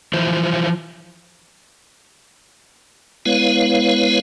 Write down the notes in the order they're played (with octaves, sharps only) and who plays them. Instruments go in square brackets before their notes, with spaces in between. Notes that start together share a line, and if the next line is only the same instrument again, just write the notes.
[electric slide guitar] E3 F3 E4 C5
[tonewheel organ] G#3 B3 E4 B4 C#5 F5